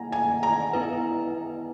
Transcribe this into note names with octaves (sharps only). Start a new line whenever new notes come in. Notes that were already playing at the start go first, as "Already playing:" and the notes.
Already playing: A#3 E4 G#5 A#5
G#5
A#5
B3 E4 B4